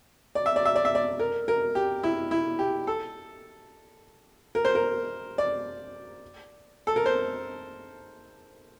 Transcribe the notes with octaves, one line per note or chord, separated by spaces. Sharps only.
D5
E5
D5
E5
D5
E5
D5
A#4
A#4
G4
E4
E4
G4
A4
A#4
C5
A#4
D5
A4
A#4
C5